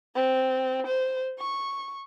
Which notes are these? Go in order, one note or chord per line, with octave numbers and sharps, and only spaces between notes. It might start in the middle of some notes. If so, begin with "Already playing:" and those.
C4
C5
C#6